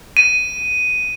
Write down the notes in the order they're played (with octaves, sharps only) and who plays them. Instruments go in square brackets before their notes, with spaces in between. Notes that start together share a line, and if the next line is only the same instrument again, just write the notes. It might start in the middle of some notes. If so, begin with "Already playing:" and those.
[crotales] D#7